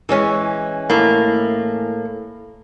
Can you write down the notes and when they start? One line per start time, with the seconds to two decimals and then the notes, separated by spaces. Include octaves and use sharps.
0.09 E3 G#3 C#4
0.90 A2 A#3